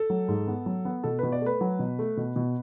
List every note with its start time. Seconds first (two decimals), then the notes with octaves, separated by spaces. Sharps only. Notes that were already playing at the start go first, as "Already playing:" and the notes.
Already playing: A4
0.10 F#3
0.28 G#2
0.47 B3
0.66 F#3
0.85 B3
1.03 B2 A4
1.19 B2 B4
1.32 D5
1.42 A3 B4
1.61 F#3
1.79 B2
1.99 A3
2.17 B2
2.36 B2